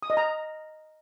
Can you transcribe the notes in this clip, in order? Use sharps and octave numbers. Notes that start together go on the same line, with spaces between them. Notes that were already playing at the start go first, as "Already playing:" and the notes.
D#6
D#5
A#5